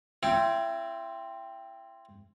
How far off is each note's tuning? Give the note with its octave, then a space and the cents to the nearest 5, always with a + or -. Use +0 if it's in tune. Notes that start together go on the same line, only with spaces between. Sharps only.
C4 +0 E4 +30